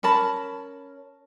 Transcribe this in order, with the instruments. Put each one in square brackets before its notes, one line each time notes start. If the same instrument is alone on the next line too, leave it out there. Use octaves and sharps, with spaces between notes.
[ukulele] C#4 A#4 A5 B5